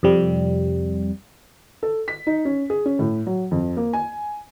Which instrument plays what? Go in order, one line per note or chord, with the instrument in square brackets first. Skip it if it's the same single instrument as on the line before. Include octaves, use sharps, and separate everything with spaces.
[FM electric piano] F2 C3 G3
[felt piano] A4
B6
D#4
C#4
G#4
C#4
A2
F#3
F2
A#3
G#5